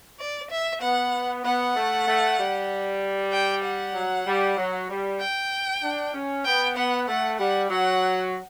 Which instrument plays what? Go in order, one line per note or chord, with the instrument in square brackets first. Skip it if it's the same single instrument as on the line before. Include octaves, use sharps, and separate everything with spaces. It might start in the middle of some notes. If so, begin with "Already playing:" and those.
[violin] D5
E5
[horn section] B3 [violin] F#5
[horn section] B3 [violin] F#5
[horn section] A3
A3
G3
[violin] G5
F#5
[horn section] F#3
G3
F#3
G3
[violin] G5
[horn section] D4
C#4
[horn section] B3 [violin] G5
[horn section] B3 [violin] F#5
[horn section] A3 [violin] F#5
[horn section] G3 [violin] F#5
[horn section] F#3 [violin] F#5